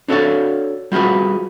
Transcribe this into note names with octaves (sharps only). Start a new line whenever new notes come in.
D4 F#4 A4 B4 C#5 D5
G3 F4 F#4 G#4 B4